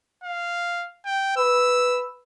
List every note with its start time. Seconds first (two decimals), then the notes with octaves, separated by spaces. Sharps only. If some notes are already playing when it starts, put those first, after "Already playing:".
0.24 F5
1.06 G5
1.37 B4 E6